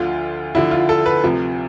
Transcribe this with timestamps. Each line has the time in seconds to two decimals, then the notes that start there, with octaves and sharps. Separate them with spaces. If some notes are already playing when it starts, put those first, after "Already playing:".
Already playing: D2 D3 F3 F4
0.55 D2 D3 F3 E4
0.71 F4
0.89 A4
1.06 B4
1.23 D2 C3 F3